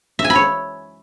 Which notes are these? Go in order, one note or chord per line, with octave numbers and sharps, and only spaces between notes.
E5
G#5
B5
C#5